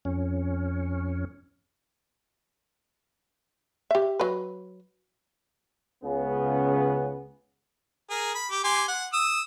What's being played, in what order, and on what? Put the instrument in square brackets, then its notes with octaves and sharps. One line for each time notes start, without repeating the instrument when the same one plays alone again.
[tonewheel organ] F2 C#4
[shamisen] G4 E5
F#3 B4
[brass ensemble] C#2 C#3 B3
[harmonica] G#4 A#4
B5
G4
G4 G#5 C6
F#5
D#6 E6